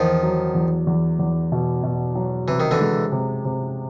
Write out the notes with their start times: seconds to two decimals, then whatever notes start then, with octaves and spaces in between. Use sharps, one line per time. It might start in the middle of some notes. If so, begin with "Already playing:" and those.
Already playing: E2 D#3 F3
0.23 F#3
0.55 E2
0.87 E2
1.19 E2
1.52 B2
1.83 B2
2.15 F#3
2.48 C3 E3
2.60 D#3
2.71 D3 E3
2.80 G#3
3.12 C3
3.45 C3